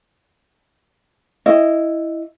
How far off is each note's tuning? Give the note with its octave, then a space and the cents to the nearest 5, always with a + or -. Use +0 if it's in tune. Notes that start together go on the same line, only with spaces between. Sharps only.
E4 +0 D#5 -5